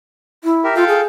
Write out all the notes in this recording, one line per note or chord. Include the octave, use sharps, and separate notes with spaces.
E4
G4 A#4 E5
F4 A4 F5 G5
G#4